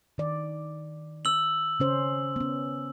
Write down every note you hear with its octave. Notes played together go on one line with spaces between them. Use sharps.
D#3 D5
E6 F#7
C#3 C#4 C5
B3 C#4